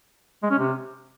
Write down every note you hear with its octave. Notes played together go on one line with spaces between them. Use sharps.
G#3
C#4
C3